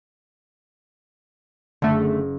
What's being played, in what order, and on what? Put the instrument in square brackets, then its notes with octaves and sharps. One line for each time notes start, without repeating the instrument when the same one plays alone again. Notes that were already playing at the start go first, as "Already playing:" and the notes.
[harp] F#1 [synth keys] D3 A3